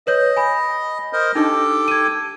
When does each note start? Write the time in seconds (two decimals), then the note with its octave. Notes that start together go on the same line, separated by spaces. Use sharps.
0.07 B4 C#5 D#5 G6
0.37 G#5 B5
1.13 A#4 C5 D#5
1.35 D4 D#4 G4 A4 G5
1.88 G#6 D#7